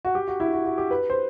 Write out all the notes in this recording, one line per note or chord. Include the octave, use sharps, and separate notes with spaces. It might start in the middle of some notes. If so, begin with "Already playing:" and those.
F#4
G4
F#4
E4
F#4
F#4
G4
B4
C5